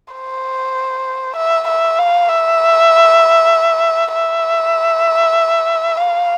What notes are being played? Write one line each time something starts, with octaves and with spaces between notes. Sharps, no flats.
C5
E5
E5
F5
E5
E5
F5